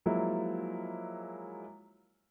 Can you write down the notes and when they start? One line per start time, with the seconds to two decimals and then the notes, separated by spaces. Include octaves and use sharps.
0.06 F3 F#3 G#3 A#3 E4